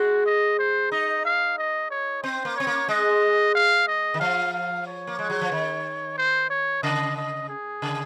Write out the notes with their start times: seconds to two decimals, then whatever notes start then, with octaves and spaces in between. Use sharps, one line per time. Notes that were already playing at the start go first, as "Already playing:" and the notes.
Already playing: G#3 F#4
0.26 D#5
0.59 C5
0.92 D#4 D#5
1.25 F5
1.58 D#5
1.90 C#5
2.23 C4 C5
2.45 A#3
2.56 C4 C#5
2.67 A#3
2.88 G#3 D#5
3.55 F5
3.87 D#5
4.14 D#3
4.20 F3 F5
4.53 F5
4.87 C#5
5.07 A#3
5.19 G#3
5.30 F#3
5.41 F3
5.52 D#3
6.18 C5
6.50 C#5
6.83 C#3 D#5
7.16 D#5
7.49 G#4
7.82 C#3